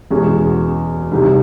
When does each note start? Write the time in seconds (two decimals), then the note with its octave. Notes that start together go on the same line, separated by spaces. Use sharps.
0.10 E2 B2 G#3 C#4
1.11 C2 C3 D#3